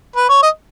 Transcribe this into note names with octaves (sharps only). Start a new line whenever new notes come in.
B4
C#5
D#5